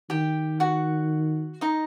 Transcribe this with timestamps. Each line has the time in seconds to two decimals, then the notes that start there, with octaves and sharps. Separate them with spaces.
0.10 D#3 G4 G5
0.60 F#4 F#5
1.61 D#4 D#5